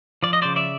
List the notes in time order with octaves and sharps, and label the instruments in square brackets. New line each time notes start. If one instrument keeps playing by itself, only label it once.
[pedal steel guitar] F3 D5
D#5
C#3 C5 D5
D5 E5